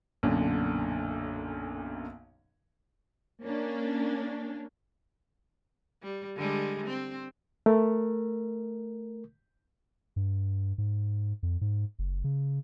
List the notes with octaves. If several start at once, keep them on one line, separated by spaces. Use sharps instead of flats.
B1 F#2 A#2 D3
A#3 C#4 D4
G3
D3 G3 G#3
C4
A3 A#4
G2
G#2
F2
G#2
F#1
C#3